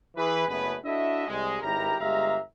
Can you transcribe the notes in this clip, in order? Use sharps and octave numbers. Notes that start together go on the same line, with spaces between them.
E3 G#4 B4
F#1 F#2 A3 B3 G#4 B4
D4 E4 F#4 A4 D#5 E5
C2 G#3
G#1 G2 E4 G4 A#4 A#5
G1 G#3 G4 E5 F5 A#5